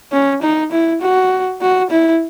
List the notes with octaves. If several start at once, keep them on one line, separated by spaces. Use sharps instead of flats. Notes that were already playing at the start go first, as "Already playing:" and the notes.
C#4
D#4
E4
F#4
F#4
E4